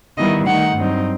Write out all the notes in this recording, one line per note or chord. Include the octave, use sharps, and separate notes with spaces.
D#3 G3 B3 E4 D#5
D#3 A3 D#4 F#5
G2 F#3 C4 D#4